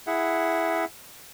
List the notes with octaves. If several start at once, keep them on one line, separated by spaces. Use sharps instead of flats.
E4 G#4 E5 F#5